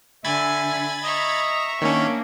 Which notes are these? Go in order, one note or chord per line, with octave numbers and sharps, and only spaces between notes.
D3 E5 G#5 B5 G#6 A6
D#5 E5 A#5 C#6
D#3 A#3 C#4 D4 C#5